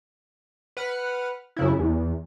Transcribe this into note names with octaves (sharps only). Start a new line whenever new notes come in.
B4 F#5 F6
F#2 C#3 E4
E2